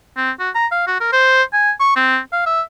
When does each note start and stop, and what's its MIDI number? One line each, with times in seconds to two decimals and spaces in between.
0.17 0.31 60
0.39 0.50 66
0.55 0.67 82
0.72 0.86 77
0.87 0.99 66
1.00 1.12 70
1.13 1.43 72
1.53 1.71 80
1.80 1.93 85
1.96 2.18 60
2.33 2.46 77
2.46 2.61 76